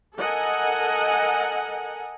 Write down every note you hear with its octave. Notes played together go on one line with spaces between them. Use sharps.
A4 A#4 D#5 F#5 G#5